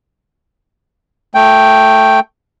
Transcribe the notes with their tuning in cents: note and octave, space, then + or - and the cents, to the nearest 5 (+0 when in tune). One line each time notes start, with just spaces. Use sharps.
A3 +0 G5 +0